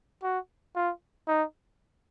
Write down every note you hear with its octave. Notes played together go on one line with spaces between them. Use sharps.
F#4
F4
D#4